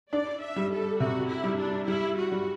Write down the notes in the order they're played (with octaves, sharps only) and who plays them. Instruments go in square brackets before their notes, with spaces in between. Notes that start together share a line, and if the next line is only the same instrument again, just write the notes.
[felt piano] D4 [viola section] D5
[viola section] E5
[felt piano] G3
[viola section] A4
[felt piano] C3 [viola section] F#4
[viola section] E4
[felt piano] G3
[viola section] D4
[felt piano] G3 [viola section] E4
[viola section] F#4
[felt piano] G3